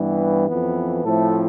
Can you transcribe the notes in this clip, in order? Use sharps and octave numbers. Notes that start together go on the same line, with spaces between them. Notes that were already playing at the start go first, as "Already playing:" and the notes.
Already playing: G2 E3 G3 B3
F2 E3 B3
A2 F3 A3 C4 A4